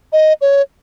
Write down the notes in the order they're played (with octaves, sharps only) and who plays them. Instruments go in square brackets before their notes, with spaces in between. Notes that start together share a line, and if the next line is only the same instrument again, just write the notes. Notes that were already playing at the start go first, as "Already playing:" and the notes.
[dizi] D#5
C#5